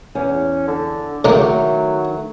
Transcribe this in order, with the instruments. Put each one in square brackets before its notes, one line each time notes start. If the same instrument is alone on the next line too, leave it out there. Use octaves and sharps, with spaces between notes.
[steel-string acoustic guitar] E2 [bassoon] C#4
[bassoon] D3
[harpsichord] C#2 A#3 [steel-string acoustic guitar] D#3 A3 [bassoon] F#3